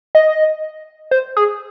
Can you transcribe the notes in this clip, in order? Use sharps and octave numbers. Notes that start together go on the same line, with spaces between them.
D#5
C5
G#4